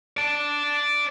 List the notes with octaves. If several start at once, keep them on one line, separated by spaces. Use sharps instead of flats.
D5 A5